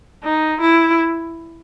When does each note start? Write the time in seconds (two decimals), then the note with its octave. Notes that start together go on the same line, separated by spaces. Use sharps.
0.23 D#4
0.61 E4